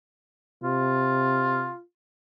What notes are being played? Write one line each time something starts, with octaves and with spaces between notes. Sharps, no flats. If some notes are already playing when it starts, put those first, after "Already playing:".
C3 F4